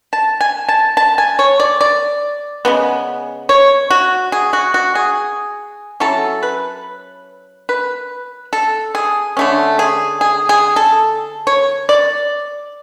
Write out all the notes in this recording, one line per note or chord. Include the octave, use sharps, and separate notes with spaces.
A5
G#5
A5
A5
G#5
C#5
D5
D5
C#3 G#3 B3
C#5
F#4
G#4
F#4
F#4
G#4
F#3 C#4 E4 A4
B4
B4
A4
G#4
D3 A3 C#4
G#4
G#4
G#4
A4
C#5
D5